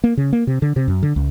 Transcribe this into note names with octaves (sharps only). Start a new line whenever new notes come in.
A#3
C#3
A#3
C3
D3
C3
F#2
D3
C#2